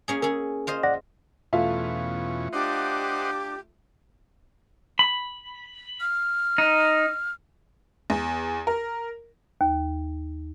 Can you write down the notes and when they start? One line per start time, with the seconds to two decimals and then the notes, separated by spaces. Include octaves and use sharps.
0.08 A#3 C#4 G#4
0.22 C#4 G#4 A#4
0.67 F4 C5 D#5
0.83 D5 F#5 A#6
1.53 E2 B2 A3 C#4 F4 E5
2.53 D4 G4 C5 D#5 F#5 D6
4.99 B5
6.01 F6
6.58 D#4
8.10 E2
8.67 A#4
9.61 D#2